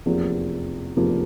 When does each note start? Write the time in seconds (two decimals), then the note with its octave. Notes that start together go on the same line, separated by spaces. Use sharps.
0.06 F1 E2 C3 F3 A#3
0.96 F1 E2 C3 F3 A#3